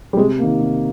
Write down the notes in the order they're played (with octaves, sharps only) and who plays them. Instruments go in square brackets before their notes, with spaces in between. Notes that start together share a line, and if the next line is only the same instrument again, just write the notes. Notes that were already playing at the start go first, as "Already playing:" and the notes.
[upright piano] G3
[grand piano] C3 [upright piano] G#3
[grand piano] D#3 A#3
C3